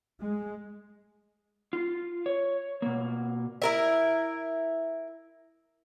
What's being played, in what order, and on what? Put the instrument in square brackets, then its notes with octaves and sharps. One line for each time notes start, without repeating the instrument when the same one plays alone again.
[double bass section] G#3
[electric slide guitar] F4
C#5
B2 A#3
[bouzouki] E4 A#4 E5